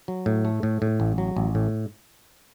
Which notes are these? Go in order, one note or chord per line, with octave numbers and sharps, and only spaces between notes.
F#3
A2
A3
A2
A2
A1
F#3
A1
A2